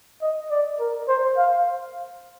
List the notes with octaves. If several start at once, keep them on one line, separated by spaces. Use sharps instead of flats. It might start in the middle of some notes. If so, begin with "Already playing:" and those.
D#5
D5
A#4
C5
F5